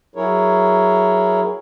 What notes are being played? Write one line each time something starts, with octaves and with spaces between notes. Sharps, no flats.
F#3 E4 G#4 A#4 C#5